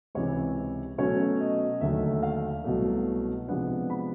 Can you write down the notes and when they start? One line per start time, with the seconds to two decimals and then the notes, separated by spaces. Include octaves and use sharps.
0.15 C#2 C3 E3 C#5
0.98 B2 F#3 A3 C#4 C#5
1.40 D#5
1.81 D#2 D3 F#3 A3 D4 E5
2.13 E5
2.23 F5
2.64 C2 B2 F#3 A3
3.48 C3 F3 G#3 B3 D4 F#5
3.90 B5